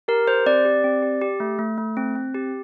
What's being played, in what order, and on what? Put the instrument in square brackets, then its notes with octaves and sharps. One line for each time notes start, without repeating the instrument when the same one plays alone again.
[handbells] G4 A#4
G4 C5
C4 D5
G4
C4
G4
G4
A3
A3
A3
C4
C4
G4